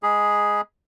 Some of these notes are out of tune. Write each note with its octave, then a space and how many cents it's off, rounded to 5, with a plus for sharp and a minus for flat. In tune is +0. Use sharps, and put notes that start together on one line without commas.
G#3 +0 G#4 +0 B5 -30